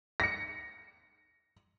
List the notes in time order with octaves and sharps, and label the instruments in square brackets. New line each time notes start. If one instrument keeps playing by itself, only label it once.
[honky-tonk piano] A#6 C#7